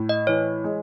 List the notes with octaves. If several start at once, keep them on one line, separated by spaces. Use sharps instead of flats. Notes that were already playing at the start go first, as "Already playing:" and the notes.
Already playing: A2
D#5
E3 C#5
G#3